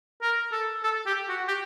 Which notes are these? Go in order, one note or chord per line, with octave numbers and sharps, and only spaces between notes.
A#4
A4
A4
G4
F#4
G4